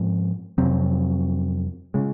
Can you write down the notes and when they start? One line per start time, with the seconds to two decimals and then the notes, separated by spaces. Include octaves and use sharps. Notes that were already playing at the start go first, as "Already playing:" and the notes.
Already playing: G#2 F3 G#3 C4
0.58 F2 C3 F#3 C4
1.94 C#3 G#3